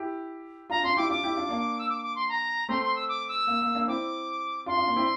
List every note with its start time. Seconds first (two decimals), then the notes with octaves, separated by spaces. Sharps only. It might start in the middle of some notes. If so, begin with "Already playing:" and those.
Already playing: E4 G4
0.70 D4 F4 A#5
0.83 D4 F4 C6
0.97 E4 G4 D6
1.09 D4 F4 D6
1.23 E4 G4
1.36 D4 F4
1.49 A#3 D4
1.78 E6
1.89 D6
2.02 D6
2.15 C6
2.29 A#5
2.69 A3 C4 C6
2.82 C6
2.95 E6
3.08 D6
3.28 E6
3.47 A#3
3.62 A#3
3.75 A#3 D4
3.87 C4 E4 D6
4.66 D4 F4 C6
4.76 D4 F4
4.87 A#3 D4
4.96 C4 E4